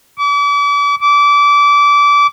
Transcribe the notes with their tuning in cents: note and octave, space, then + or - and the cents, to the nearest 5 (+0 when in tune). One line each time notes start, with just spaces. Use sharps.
D6 -40
D6 -25